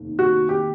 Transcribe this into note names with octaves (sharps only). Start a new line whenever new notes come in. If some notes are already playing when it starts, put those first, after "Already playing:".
Already playing: F1 D#2
F#4
G4